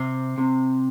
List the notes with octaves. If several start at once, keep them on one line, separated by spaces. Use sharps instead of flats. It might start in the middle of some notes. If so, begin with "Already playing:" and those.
Already playing: C3 C5
C3